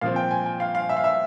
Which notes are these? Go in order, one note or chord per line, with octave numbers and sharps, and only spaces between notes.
A#2 F3 C4 F5
G5
G#5
G5
F5
F5
E5
F5
E5